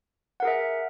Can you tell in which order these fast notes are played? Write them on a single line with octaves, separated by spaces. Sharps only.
F#5 A#4 G#4 E5